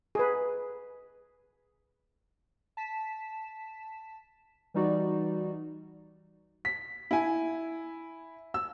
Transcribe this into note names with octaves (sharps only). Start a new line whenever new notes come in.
G#4 B4
A5 B6 E7
E3 G3 D#4 F#4 D5
B6
E4 G#5
E6